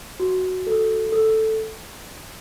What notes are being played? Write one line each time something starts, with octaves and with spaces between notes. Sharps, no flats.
F#4
A4
A4